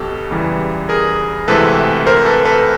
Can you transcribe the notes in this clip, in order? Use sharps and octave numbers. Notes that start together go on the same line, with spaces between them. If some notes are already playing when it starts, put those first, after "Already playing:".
Already playing: B1 B2 F#3 G4 A4
E2 C#3 E3 G3
G#4 A#4
D2 C3 E3 G#3 C4 A4 B4
A#4 C5
A4 B4
A4 B4